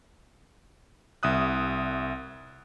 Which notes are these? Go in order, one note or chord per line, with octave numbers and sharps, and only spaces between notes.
C2 E5 D#6 F#6